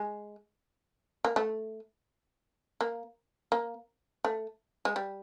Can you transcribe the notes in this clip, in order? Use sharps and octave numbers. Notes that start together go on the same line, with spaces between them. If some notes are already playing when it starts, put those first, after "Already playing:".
Already playing: G#3
A#3
A3
A#3
A#3
A3
G#3
G3